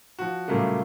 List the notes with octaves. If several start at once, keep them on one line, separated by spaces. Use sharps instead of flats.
F3 F#4
A#2 C#3 F#3 G3 A3 A#3